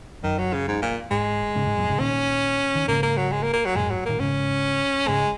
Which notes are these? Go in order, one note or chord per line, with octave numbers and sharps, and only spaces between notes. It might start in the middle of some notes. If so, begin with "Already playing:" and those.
F#2 D#3
F#3
C#3
G#2
A#2
G#2 G#3
G#2 C#3
G#2
F#2 A#2
G#2 C#3
A#2 D#3 C#4
D#3
G#2 C#3 A#3
A#3
F#3
G#3
A#3
A#3
F#3
F#2 A#2 G#3
G#2
F#3
A#2 D#3 A#3
G#2 C#3 C#4
G#2 C#3 G#3